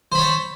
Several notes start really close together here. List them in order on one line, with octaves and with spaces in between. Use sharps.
C5 B5 C#5 A5